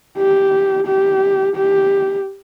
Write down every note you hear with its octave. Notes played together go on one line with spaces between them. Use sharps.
G4
G4
G4